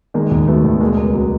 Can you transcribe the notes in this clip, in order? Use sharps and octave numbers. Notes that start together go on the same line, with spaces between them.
D#3 G#3 A#3
D#2
F#3 A3 B3
D#2
B2 G#3 A#3
C#2
F#3